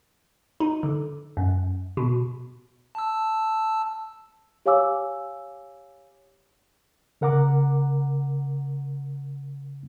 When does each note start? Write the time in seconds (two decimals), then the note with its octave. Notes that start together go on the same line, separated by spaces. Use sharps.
0.60 D#4
0.83 D3
1.37 F#2
1.97 B2
2.95 A5 E6
4.66 G4 C#5 F5 G#5 D6 E6
7.21 C#3 A#4 F#5 A#5 D6